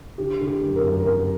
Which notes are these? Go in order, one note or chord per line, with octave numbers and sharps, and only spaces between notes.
D3 G4
D3
G4
F#2
A#4
F#2
F#2 A#4